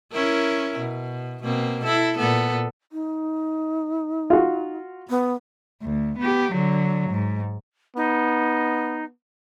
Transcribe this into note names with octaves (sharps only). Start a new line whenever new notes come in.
C#4 E4 A#4
B2
B2 A#3 C4
E4 A4
A#2 B3 A4
D#4
F4 F#4
B3
D2
B3 G4
D3 F#3
G#2
B3 D#4